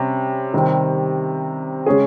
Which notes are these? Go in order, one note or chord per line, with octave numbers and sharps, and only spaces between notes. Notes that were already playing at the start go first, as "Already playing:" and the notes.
Already playing: C3 G3 C#4
C3 D#3 G3 C4
C#3 G#3 C#4 G#4